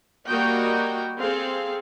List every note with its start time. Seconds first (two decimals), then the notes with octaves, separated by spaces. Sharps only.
0.28 G3 A#3 F#4 A#4 D#5 G5
1.19 C4 G#4 A4 F5